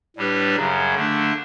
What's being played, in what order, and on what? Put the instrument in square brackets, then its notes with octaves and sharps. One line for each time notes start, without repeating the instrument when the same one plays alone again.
[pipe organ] A2 G3 D4 G4 B4
F#2 C#3 F#3
D3 A3 D4